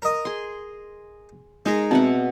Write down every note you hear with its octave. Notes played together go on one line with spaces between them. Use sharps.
A#4 D#5
G#4 C6
G#3 D#4 G#4 A#4
B2 C4 E5 F#5